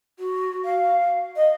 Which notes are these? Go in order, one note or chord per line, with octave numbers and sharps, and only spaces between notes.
F#4
F5
D#5